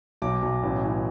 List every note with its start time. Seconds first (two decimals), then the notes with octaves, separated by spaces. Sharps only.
0.22 B1 D6
0.42 B1
0.63 A1
0.83 E3